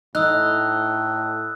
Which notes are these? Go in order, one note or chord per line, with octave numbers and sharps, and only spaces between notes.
A2 D#4 D#6 E6 F#6